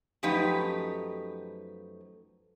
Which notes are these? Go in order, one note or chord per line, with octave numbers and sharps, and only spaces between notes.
F#2 F3 A3 D#4 G4 B4